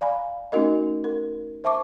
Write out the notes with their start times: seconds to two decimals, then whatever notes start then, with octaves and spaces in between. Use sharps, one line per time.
0.01 D5 F5 G#5 B5
0.52 A3 C#4 D#4 F#4 A#4 D#5
1.04 A#4
1.64 C5 E5 A5 C#6 D6